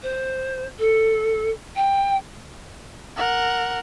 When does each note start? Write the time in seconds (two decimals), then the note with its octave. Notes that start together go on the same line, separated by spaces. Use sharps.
0.03 C5
0.79 A4
1.76 G5
3.17 A#4 F#5